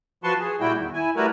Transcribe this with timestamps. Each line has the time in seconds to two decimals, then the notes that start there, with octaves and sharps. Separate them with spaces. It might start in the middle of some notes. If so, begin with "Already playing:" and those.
0.24 F3 F#4 B4 A5 C6 C#6
0.39 G#4
0.60 A#2 G3 E4 F#4 G5
0.79 E2 D#3
0.94 E4 G#5
1.16 G3 A3 E4 F#4 A#4 B4